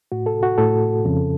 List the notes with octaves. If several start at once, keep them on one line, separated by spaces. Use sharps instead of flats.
A2 F#4
A4
F#4
A2 A4
F2 C#3